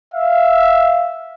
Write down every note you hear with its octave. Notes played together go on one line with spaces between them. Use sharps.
E5 F5